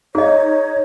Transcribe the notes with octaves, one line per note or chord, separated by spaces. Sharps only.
D#4 G#4 C#5 D#5